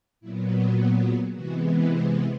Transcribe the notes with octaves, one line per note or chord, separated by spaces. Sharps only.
A#2 F#3 B3 E4
F4
G4
G#4
C3 E3 G#3 B3 F#4
C5